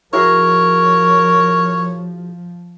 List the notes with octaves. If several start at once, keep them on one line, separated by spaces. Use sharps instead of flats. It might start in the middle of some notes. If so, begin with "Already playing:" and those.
F3 E4 F#4 G#4 A#4 C#5